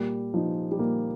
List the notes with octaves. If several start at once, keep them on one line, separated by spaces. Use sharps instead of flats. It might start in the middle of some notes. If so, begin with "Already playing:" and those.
Already playing: A#2 G3
F3 D#4
G3
A#2 A#3